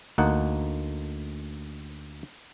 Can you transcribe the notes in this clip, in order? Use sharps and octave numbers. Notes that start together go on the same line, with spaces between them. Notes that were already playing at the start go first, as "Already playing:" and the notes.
D2 A#3 D#4 F#5